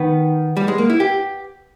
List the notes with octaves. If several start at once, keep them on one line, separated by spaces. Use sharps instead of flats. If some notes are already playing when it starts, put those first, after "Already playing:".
Already playing: D#3 B3
G3
G#3
A#3
E4
G4